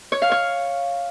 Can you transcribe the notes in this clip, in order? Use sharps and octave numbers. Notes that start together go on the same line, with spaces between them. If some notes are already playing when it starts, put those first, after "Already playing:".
C#5
F5
C#5